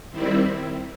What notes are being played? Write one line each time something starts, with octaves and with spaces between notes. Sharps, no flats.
D#3 G3 C4 E4